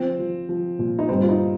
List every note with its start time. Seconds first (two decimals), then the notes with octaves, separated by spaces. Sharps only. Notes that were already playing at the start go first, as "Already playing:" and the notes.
Already playing: F3 C4
0.19 F3
0.49 F3
0.79 A#2
0.99 D#4
1.09 G2 C4
1.23 F4
1.29 D#4